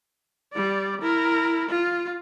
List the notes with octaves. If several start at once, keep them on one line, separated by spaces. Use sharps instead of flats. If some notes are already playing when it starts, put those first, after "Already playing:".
G3 D5
E4 A#4
F4